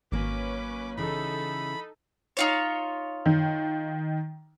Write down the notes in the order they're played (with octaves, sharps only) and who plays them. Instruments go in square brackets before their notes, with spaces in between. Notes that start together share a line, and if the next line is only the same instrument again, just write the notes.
[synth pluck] G#1 [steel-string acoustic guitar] F#3 A#3 [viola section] C#4 B4 [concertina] D6
[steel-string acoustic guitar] C#3 E3 [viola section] D#4 A4 [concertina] B5
[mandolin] D#4 F4 C#5
[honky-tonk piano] D#3